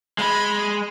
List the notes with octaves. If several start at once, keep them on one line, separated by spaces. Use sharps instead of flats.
G#3 B5